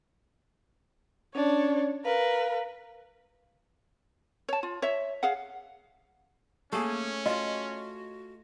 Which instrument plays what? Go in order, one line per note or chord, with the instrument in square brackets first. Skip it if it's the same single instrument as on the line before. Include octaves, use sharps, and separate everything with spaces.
[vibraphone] C#4 D5 [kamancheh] D4 C#5
[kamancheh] A#4 B4 [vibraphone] F5
[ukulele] C#5 A5
F4
C#5 E5
G#4 F5 F#5
[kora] A3 G#4 [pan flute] A#3 [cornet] C#4
[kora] F4 [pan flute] F#4 [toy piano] D#5